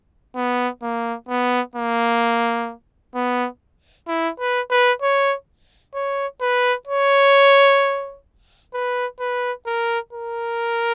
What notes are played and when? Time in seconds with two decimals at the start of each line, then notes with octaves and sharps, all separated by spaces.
0.36 B3
0.82 A#3
1.29 B3
1.76 A#3
3.15 B3
4.08 E4
4.39 B4
4.71 B4
5.02 C#5
5.94 C#5
6.41 B4
6.88 C#5
8.74 B4
9.20 B4
9.67 A#4
10.13 A#4